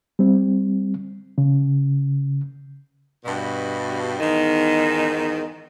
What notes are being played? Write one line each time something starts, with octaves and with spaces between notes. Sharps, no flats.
G3 C4
C#3
G2 B2
E2 G#2 D#3 D#4